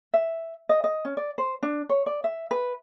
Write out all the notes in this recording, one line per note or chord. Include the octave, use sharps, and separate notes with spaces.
E5
D#5
D#5
C#4
D5
C5
D4
C#5
D5
E5
B4